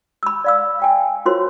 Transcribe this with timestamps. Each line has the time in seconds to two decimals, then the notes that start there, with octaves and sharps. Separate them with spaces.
0.23 B5 E6
0.44 D5 F5 E6
0.80 F5 G5 G#5
1.26 F4 F#4 A#4 C5 C#5 C6